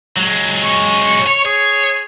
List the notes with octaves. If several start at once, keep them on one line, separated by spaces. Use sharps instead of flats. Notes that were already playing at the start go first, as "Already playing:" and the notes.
F#3 G#3
C#6
C#5
G#4 C#5